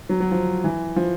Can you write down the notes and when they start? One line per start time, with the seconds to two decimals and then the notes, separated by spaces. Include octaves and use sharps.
0.09 F#3
0.20 F#3
0.31 F3
0.64 E3
0.96 F3